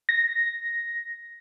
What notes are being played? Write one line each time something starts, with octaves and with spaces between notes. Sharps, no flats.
A#6